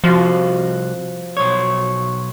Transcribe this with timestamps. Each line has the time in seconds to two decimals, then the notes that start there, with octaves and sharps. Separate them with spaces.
0.04 C2 F3 F#4 F5
1.37 B1 C#5